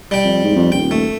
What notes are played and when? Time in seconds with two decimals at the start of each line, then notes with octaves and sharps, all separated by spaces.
0.11 G3 G5
0.24 F2
0.44 G#2
0.56 F2
0.72 D#1 G5
0.91 A3